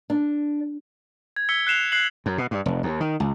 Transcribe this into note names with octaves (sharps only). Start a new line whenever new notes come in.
D4
G#6
E6 B6 C#7 G7
F#6 C7 E7 F7
F#6 C7 F#7
F#2
B2
G2
F1
D#2
D#3
C#2